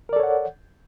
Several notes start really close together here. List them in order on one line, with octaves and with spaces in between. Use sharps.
A#4 D5 A4 C#5 F#5